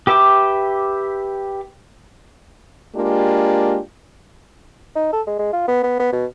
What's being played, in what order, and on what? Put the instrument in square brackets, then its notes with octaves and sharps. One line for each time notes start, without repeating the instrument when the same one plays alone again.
[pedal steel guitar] G4 B4 E5 G5 D6
[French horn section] G#3 A#3 D4 F4 G4
[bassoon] D#4
A4
G#3
G#3
F4
B3
B3
B3
B2